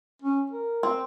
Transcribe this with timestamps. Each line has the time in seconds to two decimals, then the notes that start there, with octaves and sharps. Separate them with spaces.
0.22 C#4
0.51 A#4
0.83 C4